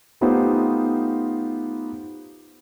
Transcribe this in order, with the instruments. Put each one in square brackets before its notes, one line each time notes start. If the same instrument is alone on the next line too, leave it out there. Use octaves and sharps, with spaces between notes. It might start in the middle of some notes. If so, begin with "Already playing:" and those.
[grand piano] A3 B3 D#4 F4 G4 C5